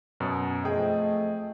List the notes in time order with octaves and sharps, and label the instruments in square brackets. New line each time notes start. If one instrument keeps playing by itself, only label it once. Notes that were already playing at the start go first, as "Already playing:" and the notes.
[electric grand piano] F#2 B2
[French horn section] F2 D#5 [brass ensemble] A3 [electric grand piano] G#4 G5